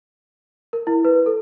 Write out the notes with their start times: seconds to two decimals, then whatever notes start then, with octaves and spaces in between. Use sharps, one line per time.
0.73 A#4
0.87 E4
1.05 B4
1.26 A4